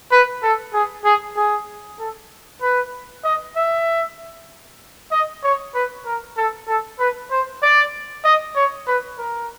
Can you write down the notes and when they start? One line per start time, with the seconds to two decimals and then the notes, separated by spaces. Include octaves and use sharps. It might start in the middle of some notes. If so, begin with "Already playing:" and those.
0.12 B4
0.43 A4
0.74 G#4
1.05 G#4
1.37 G#4
1.99 A4
2.62 B4
3.24 D#5
3.56 E5
5.11 D#5
5.44 C#5
5.75 B4
6.06 A#4
6.37 A4
6.68 A4
6.99 B4
7.31 C5
7.62 D5
8.24 D#5
8.55 C#5
8.87 B4
9.18 A#4